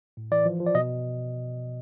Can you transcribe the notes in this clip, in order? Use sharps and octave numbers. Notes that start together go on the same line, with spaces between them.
A2
E3 D5
F3
F3
D5
B2 D#5